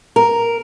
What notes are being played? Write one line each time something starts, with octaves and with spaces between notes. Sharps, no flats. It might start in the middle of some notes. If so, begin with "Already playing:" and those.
A#4